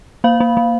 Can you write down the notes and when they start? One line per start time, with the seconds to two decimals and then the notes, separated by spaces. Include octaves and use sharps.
0.24 A#3 F5
0.40 A#3
0.57 A#3